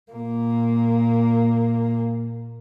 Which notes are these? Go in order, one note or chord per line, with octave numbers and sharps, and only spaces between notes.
A#2 A#3